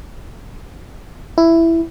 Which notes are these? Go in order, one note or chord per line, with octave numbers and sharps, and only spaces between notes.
E4